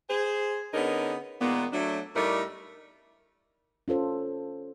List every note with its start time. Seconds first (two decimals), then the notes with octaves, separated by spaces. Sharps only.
0.09 G#4 C5
0.73 D3 B3 C#4 D#4 G#4 A#4
1.41 A#2 D#3 G#3 A#3 B3
1.72 F#3 A3 D4
2.15 A2 G3 A3 D#4 A#4 D5
3.88 C#4 F4 A4 C5